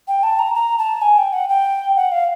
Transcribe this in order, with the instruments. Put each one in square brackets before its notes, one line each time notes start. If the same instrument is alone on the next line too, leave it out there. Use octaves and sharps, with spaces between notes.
[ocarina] G5
A5
A#5
A#5
A5
G#5
G5
F#5
G5
F#5
F5